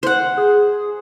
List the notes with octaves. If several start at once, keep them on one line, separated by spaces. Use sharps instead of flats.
C5 F#5
G#4